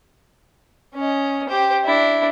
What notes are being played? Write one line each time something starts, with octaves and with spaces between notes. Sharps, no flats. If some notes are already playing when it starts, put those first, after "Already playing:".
C#4 D#5
G4 C5
D4 E4